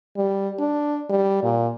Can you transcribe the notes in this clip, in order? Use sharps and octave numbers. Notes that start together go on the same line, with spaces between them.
G3
D4
G3
A#2